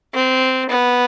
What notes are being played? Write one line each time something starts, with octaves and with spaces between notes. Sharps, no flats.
C4
B3